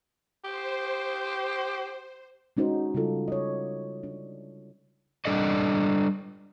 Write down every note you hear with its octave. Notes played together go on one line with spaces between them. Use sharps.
G4 C5
G#3 C#4 D#4 F#4 C5
C#3 G3 D4 F4 A4
C#5 D#5
D4
G3 D4 A4 D5 D#5